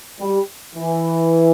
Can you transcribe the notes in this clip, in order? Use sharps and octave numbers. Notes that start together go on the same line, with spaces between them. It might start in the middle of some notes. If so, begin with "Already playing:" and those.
G3
E3